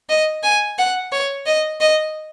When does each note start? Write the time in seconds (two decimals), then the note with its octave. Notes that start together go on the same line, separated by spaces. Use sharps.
0.09 D#5
0.43 G#5
0.79 F#5
1.12 C#5
1.46 D#5
1.81 D#5